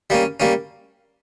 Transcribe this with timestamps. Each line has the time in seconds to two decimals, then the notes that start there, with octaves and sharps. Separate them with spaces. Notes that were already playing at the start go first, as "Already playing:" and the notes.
0.10 G3 A#3 C#4
0.40 G3 A#3 C#4